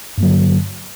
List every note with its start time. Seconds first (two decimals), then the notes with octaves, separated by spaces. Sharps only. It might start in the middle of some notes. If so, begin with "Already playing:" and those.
0.18 G2
0.20 A#3
0.23 F#3
0.25 D3